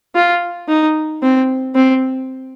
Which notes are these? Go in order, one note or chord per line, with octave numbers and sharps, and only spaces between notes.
F4
D#4
C4
C4